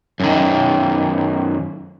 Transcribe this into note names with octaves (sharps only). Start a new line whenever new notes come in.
F#2 D#3